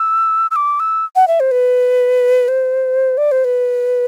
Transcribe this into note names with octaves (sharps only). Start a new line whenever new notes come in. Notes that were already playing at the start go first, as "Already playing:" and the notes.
Already playing: E6
E6
D6
E6
F#5
E5
C5
B4
C5
D5
C5
B4